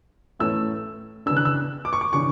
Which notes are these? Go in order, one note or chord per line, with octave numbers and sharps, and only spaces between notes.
A2 E3 A3 C#4 E6
C#3 E3 B3 D4 E6
F#6
E6
D6
C#6
D6
C#3 E3 B3 D4 C#6